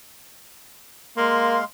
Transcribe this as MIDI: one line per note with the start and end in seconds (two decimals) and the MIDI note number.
1.17 1.64 56
1.17 1.58 58
1.17 1.64 77
1.17 1.64 84